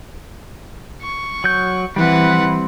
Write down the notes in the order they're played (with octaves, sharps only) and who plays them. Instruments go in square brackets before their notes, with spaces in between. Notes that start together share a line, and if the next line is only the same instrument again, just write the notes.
[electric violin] C#6
[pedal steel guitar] F#3 G6
[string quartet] E3 [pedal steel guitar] G3 C4 [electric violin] B4 F#5